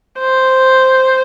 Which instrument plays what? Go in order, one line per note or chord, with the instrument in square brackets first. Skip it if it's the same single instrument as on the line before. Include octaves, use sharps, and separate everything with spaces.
[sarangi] C5